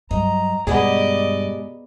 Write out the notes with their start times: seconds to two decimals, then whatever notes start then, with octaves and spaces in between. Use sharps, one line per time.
0.11 G2 F#3 D#5 A#5
0.67 G2 B2 G#3 B3 G4 G#4 D5 D#5